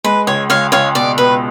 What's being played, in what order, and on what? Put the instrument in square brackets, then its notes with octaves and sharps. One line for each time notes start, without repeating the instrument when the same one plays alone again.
[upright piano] G#3 [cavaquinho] B4
[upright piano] C#2 [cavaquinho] C#5
[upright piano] C#2 [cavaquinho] C#5 F5
[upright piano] C#2 [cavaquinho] C#5 F5
[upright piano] B2 [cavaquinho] D5
[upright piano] B2 [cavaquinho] B4